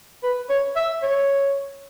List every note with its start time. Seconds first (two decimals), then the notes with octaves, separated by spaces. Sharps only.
0.23 B4
0.49 C#5
0.76 E5
1.03 C#5